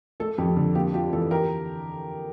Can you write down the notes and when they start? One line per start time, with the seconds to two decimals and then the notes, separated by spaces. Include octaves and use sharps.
0.20 A3 A4
0.38 F2 G4
0.57 D3
0.75 A#3 G4
0.94 F4 G4
1.12 E3 A4
1.31 G4 A#4